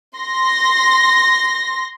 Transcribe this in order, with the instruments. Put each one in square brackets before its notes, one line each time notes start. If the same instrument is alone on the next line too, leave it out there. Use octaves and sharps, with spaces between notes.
[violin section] C6 A#6